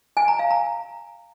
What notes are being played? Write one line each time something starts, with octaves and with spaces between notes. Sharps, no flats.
G#5
A#5
F5
A#5